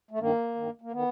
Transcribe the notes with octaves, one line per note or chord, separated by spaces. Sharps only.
A3
G2 D#3 A#3
G2 D#3
A#3
D#3 B3